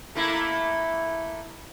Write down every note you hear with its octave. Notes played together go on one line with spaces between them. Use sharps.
A3 A#3 E4